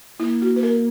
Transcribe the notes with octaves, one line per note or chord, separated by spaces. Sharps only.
A#3 E4
F#4
B4
A#4